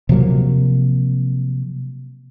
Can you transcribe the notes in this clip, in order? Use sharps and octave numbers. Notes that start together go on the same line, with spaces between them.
C3 F3 F#3 A#3